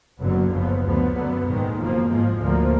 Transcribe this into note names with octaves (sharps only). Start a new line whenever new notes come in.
F#1 F#2 D3 F#3 B3
F#1 F#2 F3 B3
D2 D3 F3 B3
F#2 D3 F#3 B3
A#1 G#2 D#3 G#3
F#1 F2 F3 A#3
G#1 G#2 F3 G#3
D2 D3 F3 A#3